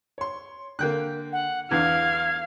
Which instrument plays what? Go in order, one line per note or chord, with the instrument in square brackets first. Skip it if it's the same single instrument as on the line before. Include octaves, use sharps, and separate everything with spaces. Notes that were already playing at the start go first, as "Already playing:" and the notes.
[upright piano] C#5 C6
[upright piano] D3 [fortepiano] A#3 G5 F#6
[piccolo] F#5
[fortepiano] E2 D3 [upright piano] E3 [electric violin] F5 [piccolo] G#6